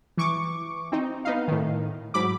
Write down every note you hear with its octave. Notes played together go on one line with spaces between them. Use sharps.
E3 C#6 D6
C4 D#4
B3 D#4 F5
A2 D#3
G#2 F#3 B5 D6